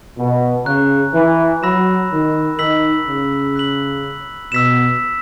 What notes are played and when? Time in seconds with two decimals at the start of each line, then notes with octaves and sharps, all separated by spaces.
0.18 B2
0.65 C#3 A#5 C#6 F#6
1.14 E3
1.63 F#3 B5 E6 A#6 E7
2.11 D#3
2.59 D#3 E6 B6 F#7
3.07 C#3
3.56 F#6 B6 F#7
4.52 B2 E6 B6 E7